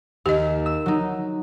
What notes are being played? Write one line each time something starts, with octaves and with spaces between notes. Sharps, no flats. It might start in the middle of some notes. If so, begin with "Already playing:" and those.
D#2 G4 D#5
E6
F#3 D#4